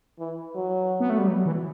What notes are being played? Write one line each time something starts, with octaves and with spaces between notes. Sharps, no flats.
E3
F#3
B3
A3
G3
F#3
E3